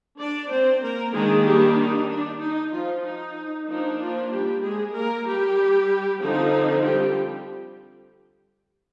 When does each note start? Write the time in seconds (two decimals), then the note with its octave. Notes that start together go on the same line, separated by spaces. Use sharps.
0.18 D4 D5
0.51 C4 C5
0.82 A#3 A#4
1.14 D#3 G#3 A#3 D4 G#4
1.46 G3 G4
1.78 D#4
2.10 D4
2.40 D#4
2.72 F3 F4
3.04 D#4
3.68 F3 A#3 D4 D#4
4.00 F3 F4
4.31 G3 G4
4.63 G#3 G#4
4.94 A#3 A#4
5.26 G3 G4
6.22 D3 F3 C4 D#4
6.85 G3 G4